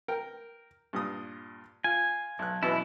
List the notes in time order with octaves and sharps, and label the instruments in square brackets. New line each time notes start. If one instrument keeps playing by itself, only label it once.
[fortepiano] A#4 G5
G2 A#2 D#6
[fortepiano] F4 [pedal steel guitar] G#5
[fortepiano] B1 F#6
[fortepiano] F#2 B2 E3 [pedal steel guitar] E4